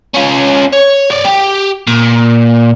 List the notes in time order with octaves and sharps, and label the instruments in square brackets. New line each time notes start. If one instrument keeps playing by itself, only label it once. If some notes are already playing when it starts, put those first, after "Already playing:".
[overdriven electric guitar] C#4 F4
C#5
C#5 D5
G4
A#2